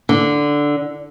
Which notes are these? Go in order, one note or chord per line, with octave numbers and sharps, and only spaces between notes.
D3